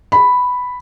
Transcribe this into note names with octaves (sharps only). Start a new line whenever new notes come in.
B5